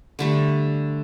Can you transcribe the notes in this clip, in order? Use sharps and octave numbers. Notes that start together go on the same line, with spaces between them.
D3 G3 A3